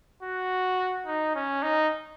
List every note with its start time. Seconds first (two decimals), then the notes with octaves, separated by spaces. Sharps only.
0.23 F#4
1.06 D#4
1.35 C#4
1.62 D#4